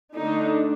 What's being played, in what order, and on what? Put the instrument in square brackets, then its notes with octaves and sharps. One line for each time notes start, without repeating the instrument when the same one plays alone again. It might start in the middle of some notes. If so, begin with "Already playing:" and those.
[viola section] D3 A3 D4 D#4